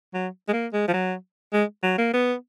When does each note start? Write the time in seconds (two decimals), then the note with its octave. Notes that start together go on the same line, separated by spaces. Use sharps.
0.14 F#3
0.48 G#3
0.53 A#3
0.73 G#3
0.88 F3
0.94 F#3
1.53 G#3
1.83 F#3
1.98 A#3
2.13 B3